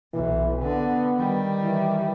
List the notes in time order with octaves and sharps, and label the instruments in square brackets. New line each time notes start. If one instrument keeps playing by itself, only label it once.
[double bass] B1 [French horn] E3
[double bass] D3 [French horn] B3
[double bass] D#3 G3
[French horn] E3